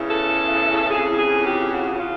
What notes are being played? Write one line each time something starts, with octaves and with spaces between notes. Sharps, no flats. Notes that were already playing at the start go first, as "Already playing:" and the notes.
Already playing: E2 C#3 E3
A4
F2 C#3 E3 G#4
G#4
G4
F#4
C#3 E3 F4